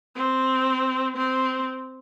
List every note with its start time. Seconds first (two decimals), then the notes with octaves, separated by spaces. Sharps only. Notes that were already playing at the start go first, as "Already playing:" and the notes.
0.16 C4
1.17 C4